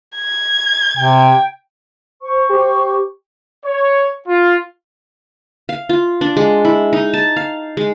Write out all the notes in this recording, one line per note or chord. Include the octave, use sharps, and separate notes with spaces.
G#6
C3 G5
C5 C#6
G4
C#5
F4
F5
F4
D4
G#3
E4
D#4
A5
F5
G#3